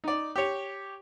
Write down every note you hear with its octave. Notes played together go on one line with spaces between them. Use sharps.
D#4 D5
G4 C#5